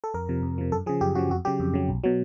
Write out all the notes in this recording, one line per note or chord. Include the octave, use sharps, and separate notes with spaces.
A4
F2 A#4
C3 F3
F2
C3 F3
F#2 A4
C#3 F3 G#4
F#2 G4
C#3 F3 F#4
F2 F#4
C#3 F#3 G4
F2
C#3 F#3
B1
B2 F#3